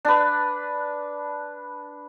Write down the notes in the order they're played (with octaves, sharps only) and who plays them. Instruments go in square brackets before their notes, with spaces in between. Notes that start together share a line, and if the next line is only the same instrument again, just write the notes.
[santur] D4 B4